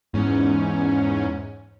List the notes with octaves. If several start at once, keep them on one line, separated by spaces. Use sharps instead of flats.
E2 G#2 C#4